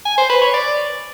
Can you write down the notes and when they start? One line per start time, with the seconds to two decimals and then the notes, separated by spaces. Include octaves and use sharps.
0.06 G#5
0.18 C5
0.30 B4
0.42 C#5
0.54 D5